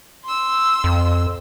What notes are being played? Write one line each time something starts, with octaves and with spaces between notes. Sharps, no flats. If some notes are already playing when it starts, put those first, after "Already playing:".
C6 E6
F2